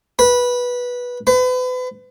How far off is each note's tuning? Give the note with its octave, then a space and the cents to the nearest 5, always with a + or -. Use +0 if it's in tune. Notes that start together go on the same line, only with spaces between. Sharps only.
B4 -15
B4 +35